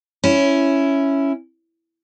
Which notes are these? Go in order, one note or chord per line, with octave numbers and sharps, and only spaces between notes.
C#4 E4